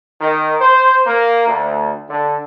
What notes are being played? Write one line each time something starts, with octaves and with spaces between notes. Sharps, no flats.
D#3
C5
A#3
D2
D3